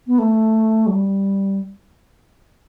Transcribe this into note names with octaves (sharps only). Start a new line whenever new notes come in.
B3
A3
F#3
G3